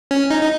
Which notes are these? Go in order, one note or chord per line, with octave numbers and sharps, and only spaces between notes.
C#4
D#4
D#4